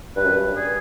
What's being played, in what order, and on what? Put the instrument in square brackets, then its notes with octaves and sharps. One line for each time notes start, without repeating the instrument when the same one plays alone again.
[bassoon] G2 [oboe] B4
[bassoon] F#2
G2
[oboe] G#4